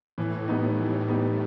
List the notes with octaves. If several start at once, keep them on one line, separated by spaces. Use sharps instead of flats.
A2 E3
G3 B3 D#4
E3
G3 B3 D#4